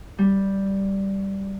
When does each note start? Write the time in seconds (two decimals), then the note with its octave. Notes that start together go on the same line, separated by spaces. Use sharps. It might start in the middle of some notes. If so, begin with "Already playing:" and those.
0.18 G3